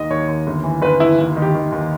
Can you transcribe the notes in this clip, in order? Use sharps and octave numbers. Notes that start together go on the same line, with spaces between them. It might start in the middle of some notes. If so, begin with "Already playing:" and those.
Already playing: D#2 D#3 D#5
D#2 C#5
D#2
G1
E3
G1 B4
G1 E4
D#2
D#3
G4
D#3
D#2